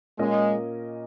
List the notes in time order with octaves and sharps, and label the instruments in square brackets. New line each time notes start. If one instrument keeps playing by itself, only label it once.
[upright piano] A#2 A#3 C#4 A#4 D#5 [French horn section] G#3